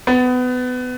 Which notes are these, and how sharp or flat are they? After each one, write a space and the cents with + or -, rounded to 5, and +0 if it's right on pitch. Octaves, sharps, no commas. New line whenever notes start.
B3 +25